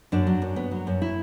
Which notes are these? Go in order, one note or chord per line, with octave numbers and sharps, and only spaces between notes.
F#2 D4
F#3
F#2
B3
F#3
F#2
E4